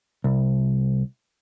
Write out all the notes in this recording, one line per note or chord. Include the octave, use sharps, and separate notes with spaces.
C2